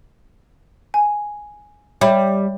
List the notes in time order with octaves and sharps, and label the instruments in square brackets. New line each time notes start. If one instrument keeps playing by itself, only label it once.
[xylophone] G#5
[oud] G3 [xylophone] C#5 E5 B5